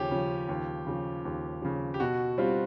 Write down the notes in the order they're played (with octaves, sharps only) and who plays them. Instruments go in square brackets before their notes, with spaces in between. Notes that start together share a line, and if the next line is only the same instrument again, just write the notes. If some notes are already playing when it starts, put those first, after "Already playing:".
Already playing: [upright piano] D#2 C#3 F3 [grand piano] C#4 G4
[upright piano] C#3 F3
D#2
C#3 F3
D#2
C#3 F3
[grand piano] G4
[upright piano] B2 [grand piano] F#4
[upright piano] G3 C4 F4